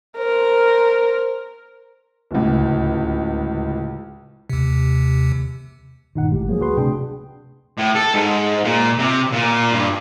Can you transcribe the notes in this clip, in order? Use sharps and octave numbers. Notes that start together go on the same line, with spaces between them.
A#4 C5
D1 C#2
D#2 C3
G1 A#2 D#3 D#4 F#5
G#1 A2 G#3 G4
F3 F#3 A#3 G#4
D2 F#4 B4 C6
C3 A3 D4 G5
A2
A4
G#2
A#2
C3
A#2
G2